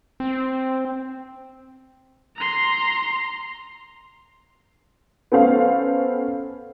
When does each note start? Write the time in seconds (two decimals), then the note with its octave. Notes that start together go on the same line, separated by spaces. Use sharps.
0.20 C4
2.36 A#5 C6
5.32 B3 C#4 A4 C5 F5